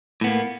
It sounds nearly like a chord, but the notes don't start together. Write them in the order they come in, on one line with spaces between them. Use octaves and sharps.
A2 B3 A#3